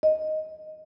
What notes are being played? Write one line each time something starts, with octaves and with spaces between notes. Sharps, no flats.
D#5